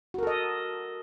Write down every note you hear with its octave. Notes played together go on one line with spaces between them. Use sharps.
F#4 A4 A#4 D#5